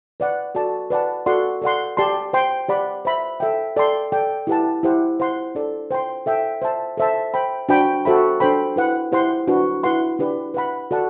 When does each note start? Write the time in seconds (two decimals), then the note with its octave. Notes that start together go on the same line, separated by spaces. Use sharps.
0.20 B4 D5 F#5
0.55 F#4 A4 D5 A5
0.90 B4 D5 F#5 A5
1.26 F#4 A4 D5 F#5 C6
1.62 A4 D5 F#5 C6
1.97 G4 D5 A5 C6
2.33 C5 G5 C6
2.69 G4 D5 F#5 B5
3.05 C5 E5 B5
3.40 A4 E5 G5
3.76 A4 D5 G5 C6
4.12 A4 D5 G5
4.47 E4 G4 B4 F#5 A5
4.83 E4 G4 C5 F#5
5.20 C5 F#5 C6
5.55 D4 A4 D5
5.91 C5 G5 C6
6.26 A4 E5 G5
6.62 C5 E5 A5
6.97 A4 C5 E5 A5
7.34 C5 G5 B5
7.69 D4 F#4 C5 G5 B5
8.05 F#4 A4 C5 E5 B5
8.40 D4 A4 C5 G5 B5
8.76 E4 B4 F#5
9.12 E4 G4 C5 F#5 C6
9.48 D4 F#4 B4
9.83 E4 B4 F#5 C6
10.19 D4 G4 B4 D5
10.54 B4 F#5 B5
10.91 F#4 A4 D5 F#5 A5